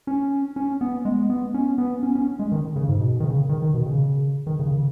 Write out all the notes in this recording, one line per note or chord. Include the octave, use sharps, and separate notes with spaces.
C#4
C#4
B3
G#3
B3
C#4
B3
C#4
C#4
G#3
D#3
C#3
G#2
B2
D#3
C#3
D#3
D#3
B2
C#3
D#3
C#3
C#3